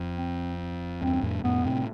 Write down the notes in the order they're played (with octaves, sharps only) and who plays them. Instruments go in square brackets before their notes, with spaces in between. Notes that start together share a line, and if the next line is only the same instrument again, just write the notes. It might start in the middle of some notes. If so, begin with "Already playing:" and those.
Already playing: [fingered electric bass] F2
[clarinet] C4
[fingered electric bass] E2 G2 [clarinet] C4
[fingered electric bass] F2 A2
[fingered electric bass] F2 A2 [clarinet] B3
[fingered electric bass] A2 C3 [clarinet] C4